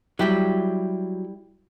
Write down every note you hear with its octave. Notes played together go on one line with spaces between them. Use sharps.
F#3 G3 E4 G4